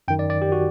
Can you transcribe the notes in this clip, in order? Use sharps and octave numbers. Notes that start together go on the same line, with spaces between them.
F#2 D#3 G5
D5
D5
G4
F#4